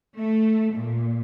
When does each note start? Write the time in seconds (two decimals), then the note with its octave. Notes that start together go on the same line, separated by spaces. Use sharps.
0.17 A3
0.74 A#2